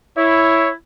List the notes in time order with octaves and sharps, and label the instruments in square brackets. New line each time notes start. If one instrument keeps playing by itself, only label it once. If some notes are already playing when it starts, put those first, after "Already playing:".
[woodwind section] E4 [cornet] C#5